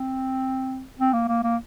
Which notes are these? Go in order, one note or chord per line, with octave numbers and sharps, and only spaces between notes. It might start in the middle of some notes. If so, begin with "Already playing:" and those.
Already playing: C4
C4
A#3
A#3
A#3